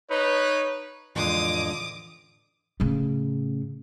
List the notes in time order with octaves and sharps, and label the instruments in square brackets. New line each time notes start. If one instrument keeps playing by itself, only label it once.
[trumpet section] D#4 B4 [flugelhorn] C#5
[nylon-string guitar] F2 D3 G#3 [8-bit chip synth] A2 E3 [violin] D6 D#6
[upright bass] A2 C#3